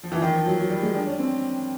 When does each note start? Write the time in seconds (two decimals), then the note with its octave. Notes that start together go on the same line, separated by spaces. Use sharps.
0.03 F3
0.12 E3
0.22 D#3
0.33 F3
0.46 F#3
0.58 F#3
0.70 G3
0.82 G#3
0.94 D4
1.07 C#4
1.19 C4